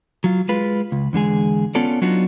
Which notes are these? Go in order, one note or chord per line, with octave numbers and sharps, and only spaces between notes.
F#3 F4
G#3 F4 B4
C#2
E2 D3 G#3 G#4
B3 C#4 F4 A4 C#5 D5
F#3 B3 D4 D#4 F4 F#4